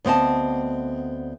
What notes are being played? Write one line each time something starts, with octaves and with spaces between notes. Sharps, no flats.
D2 B3 C4 D#5 A5